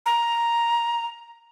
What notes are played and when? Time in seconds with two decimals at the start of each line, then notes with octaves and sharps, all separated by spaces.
0.06 A#5